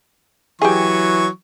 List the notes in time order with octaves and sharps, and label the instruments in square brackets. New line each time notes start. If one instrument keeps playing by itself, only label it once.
[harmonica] E3 F#3 C#6 [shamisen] G4 G#4